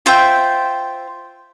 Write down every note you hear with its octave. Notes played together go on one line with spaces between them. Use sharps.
F4 C5 E5 G5